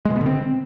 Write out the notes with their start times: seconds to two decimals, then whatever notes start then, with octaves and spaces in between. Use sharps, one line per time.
0.05 G#3
0.10 B2
0.16 B3
0.21 D3
0.26 C4